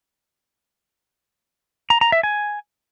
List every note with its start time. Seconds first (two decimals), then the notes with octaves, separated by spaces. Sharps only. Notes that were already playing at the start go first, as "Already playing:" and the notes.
1.90 A#5
2.01 A#5
2.12 E5
2.23 G#5